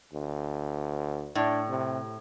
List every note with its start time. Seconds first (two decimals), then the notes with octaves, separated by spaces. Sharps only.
0.13 D2
1.35 A2 D4
1.69 C3